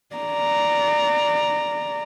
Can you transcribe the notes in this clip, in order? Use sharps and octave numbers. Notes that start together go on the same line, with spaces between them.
D5 A#5